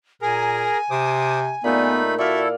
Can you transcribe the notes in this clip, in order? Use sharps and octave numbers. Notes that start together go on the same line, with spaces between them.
A#2 G#4 A#4 G#5 A#5
C3 C5 D6 D#6
A#2 A3 B3 D#4 G#4 B5
E4 F#4 A4 D5 E5 F5